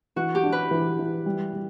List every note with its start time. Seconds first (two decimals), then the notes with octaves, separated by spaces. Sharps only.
0.16 E3 F#4
0.35 G4
0.43 D4
0.52 B4
0.71 E3
0.99 E3
1.26 G3
1.53 G3